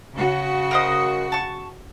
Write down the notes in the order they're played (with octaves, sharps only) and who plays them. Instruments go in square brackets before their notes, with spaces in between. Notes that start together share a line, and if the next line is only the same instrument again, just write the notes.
[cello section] C#3 F#4
[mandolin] A#4 C5 D#5
A5 C#6